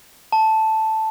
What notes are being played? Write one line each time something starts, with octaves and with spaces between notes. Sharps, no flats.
A5